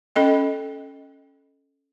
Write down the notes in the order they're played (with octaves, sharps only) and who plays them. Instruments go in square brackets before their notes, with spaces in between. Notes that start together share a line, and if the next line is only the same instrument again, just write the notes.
[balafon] C#4 A4 D#5 G5